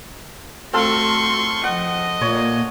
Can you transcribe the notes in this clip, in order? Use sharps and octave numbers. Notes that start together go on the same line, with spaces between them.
A3 C4 F4 F#4 A4 C6 C#6
F3 D#5 F#5
A#2 A#3 C#5